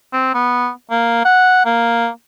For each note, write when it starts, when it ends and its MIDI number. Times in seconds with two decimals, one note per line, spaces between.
0.13 0.33 60
0.34 0.69 59
0.91 1.24 58
1.25 1.65 78
1.65 2.08 58